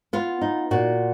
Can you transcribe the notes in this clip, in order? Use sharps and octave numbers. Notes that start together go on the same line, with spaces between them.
B3 F4
D#4
A#2 F#4